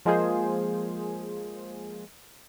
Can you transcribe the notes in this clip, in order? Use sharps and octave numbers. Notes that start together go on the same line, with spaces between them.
F3 G#3 A#3 F4 G#4 C5